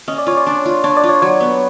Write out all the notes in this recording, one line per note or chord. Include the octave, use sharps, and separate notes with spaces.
C#4 D#5
D5
F4 C#5
D5
D4
F4
D4 C#5
D5
F4
C#5
F#3 C#5
B3